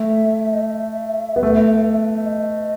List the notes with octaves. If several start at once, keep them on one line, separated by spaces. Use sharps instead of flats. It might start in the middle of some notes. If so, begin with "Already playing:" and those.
Already playing: A3 E5
D#5
E5
B3
A3
E5
D#5